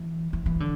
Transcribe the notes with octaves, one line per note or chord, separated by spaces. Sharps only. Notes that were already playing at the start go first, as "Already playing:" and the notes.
Already playing: E3
E3
E3
D3